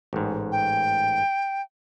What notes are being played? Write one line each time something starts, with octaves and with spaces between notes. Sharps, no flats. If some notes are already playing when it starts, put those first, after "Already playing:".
A1 G#2
G5